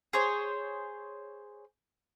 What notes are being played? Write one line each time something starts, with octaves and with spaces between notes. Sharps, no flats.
G#4 C5 C#5